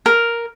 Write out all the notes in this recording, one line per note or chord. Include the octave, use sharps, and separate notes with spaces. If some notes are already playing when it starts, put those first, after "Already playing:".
A#4